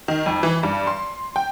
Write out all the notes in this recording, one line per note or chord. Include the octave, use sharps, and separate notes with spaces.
D#3
F2
E3
G2
C6
G5